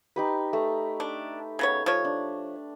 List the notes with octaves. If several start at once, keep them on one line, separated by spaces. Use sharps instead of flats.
D#4 G4 B4
A3
D4
C#3 B3 C#5
F3 C#5
D4